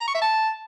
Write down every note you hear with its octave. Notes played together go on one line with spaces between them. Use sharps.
A#5
C#6
E5
A5